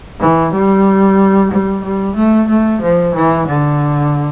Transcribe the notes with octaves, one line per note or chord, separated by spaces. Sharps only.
E3
G3
G3
G3
A3
A3
F3
E3
D3